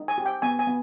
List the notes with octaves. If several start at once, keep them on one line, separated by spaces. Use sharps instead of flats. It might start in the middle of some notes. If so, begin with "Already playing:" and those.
Already playing: D#4
G#5
G4
G5
B3 G#5
G#5
B3